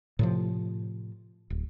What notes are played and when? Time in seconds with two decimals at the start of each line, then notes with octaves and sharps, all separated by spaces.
0.19 A2 C3 F3
1.50 D1